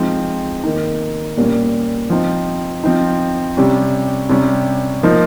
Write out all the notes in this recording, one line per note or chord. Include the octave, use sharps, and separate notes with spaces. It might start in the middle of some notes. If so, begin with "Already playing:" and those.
Already playing: F3 G#3 C4 D#4
D#3 A#3 D#4
A#2 G3 A#3 C#4
F3 C4 D#4
F3 C4 D#4
C3 G3 C#4
C3 G3 C#4
F3 A#3 D#4